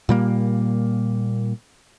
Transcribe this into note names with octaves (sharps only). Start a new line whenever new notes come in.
A#2 G3 A#3